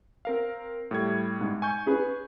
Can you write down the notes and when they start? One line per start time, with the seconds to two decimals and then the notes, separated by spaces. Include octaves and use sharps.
0.25 C4 A#4 F5
0.91 A2 G3 G#6
1.41 G#2
1.62 G#5 C#6 G6
1.86 C#4 G#4 B4